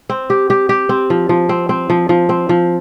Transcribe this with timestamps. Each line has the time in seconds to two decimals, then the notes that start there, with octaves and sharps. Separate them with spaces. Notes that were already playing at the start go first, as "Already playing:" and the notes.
0.10 C4
0.30 G4
0.50 G4
0.69 G4
0.89 C4
1.10 F3
1.29 F3
1.49 C4
1.69 C4
1.90 F3
2.09 F3
2.29 C4
2.49 F3